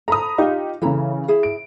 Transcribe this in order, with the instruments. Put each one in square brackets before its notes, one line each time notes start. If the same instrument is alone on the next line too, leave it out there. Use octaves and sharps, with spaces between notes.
[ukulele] A4 [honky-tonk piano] A#5 B5 D#6
[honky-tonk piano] D#4 G4 F5 [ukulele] F4 D#5
[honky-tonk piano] C#3 E3 [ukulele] E4 A4 A#5
[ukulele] E4 G#4
[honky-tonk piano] D7